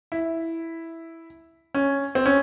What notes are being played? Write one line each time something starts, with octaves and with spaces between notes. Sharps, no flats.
E4
C#4
C4
C#4